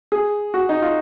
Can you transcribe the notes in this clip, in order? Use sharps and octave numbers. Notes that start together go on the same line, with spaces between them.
G#4
F#4
D#4
F4